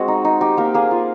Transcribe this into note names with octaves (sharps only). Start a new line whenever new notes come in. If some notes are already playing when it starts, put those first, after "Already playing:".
Already playing: G#3 C4 F#4
D#4
D#4
D#4 G4
A#3 G4
A#3 G#4
F4